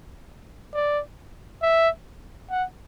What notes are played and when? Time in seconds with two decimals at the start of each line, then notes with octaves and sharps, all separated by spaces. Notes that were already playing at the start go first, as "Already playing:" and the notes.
0.74 D5
1.63 E5
2.50 F#5